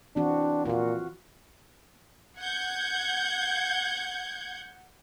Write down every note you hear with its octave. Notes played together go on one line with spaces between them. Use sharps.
E3 C4 D4 F#4
A#2 F4 F#4
F#5 G6 G#6